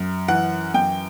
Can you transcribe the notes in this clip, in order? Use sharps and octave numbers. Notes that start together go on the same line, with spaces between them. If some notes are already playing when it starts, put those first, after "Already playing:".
Already playing: F#2
E3 F#5
F#2 G5